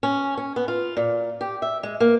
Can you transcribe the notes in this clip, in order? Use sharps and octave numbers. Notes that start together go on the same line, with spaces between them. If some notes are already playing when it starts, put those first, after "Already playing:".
C#4
C#4
B3
F4
A#2
G4
E5
G#3
A#3